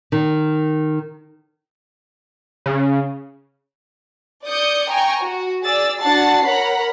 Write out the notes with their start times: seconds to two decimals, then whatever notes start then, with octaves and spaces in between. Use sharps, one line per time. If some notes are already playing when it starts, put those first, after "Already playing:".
0.12 D#3
2.66 C#3
4.45 D5 D#6 G6 C#7
4.89 G5 G#5 A#5 C#6
5.21 F#4
5.62 G#4 D5 E6 A6
5.99 D4 F#4 F#5 A5 A6 C7
6.45 A#4 C#5 F#5 A#5 B5